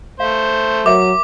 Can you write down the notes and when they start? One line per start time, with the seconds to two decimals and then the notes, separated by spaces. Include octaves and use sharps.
0.20 A3 C5 F5
0.86 F#3 A#4 E5 D6